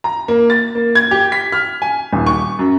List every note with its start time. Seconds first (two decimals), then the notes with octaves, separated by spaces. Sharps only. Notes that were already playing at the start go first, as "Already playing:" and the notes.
0.04 A#5
0.28 A#3
0.50 A6
0.75 A#3
0.95 G#6
1.11 G4
1.32 B6
1.52 F6
1.82 G#5
2.13 D#1
2.26 C#6
2.59 F#2